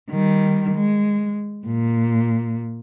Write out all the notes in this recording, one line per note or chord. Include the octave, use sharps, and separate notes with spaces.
D#3 G3
G#3
A#2